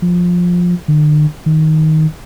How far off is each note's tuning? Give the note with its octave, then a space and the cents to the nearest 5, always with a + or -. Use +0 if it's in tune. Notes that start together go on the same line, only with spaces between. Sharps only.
F3 +15
D3 +45
D#3 +10